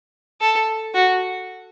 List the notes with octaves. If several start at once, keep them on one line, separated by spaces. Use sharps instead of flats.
A4
F#4